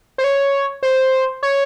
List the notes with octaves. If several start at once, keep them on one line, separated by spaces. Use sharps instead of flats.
C5
C#5
C5
C#5